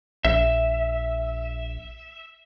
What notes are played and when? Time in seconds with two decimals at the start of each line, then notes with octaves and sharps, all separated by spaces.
0.25 A#1 E5